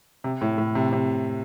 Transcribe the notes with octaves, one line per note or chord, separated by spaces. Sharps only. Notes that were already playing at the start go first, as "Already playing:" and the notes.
C3
A2
A2
C3
C3